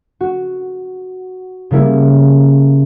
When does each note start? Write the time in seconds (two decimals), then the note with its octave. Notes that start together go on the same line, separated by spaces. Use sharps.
0.21 F#4
1.71 C#3 G3 A#3 E4